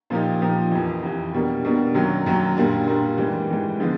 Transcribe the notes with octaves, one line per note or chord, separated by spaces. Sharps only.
A#2 F3 A#3 D#4 G4
A#2 F3 A#3 D#4 G4
F2 C3 E3
F2 C3 E3
B2 G3 A#3 D4
B2 G3 A#3 D4
F#2 D#3 F#3 A#3
F#2 D#3 F#3 A#3
A#2 G3 A#3 D4
A#2 G3 A#3 D4
G#2 E3 G3
G#2 E3 G3
D3 F3 G#3 B3